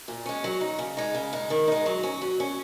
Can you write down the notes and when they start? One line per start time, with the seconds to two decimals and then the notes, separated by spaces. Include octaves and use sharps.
0.08 A#2
0.26 G#3 C#4
0.44 F#3
0.61 D#4
0.79 C#3
0.97 G#3 D#4
1.15 C#3
1.33 G#3 D#4
1.50 D#3
1.68 G#3 D#4
1.86 F#3
2.03 C#4
2.22 F#3
2.40 C#4